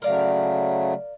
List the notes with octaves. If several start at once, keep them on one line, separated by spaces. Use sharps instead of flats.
C#3 F#3 A3 A#4 D5 F5